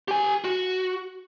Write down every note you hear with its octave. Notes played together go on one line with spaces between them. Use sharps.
G4 G#5
F#4